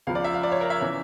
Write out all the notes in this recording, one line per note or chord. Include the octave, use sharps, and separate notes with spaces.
C#2 C#3 F3 F5
D5
E5
F5
D5
C#5
A#4
E5
C#3 E3